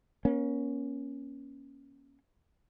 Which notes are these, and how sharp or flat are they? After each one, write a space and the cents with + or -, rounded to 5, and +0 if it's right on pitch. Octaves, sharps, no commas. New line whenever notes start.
A#3 +35 C#4 +0